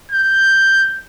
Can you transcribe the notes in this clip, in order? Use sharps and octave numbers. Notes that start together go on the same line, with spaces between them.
G6